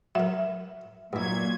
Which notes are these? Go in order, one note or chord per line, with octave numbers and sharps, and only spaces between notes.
F#3 A#4 E5
G2 A#2 F#3 E4 G#6